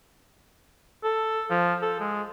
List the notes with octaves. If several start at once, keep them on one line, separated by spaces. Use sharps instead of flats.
A4
F3
A4
G#3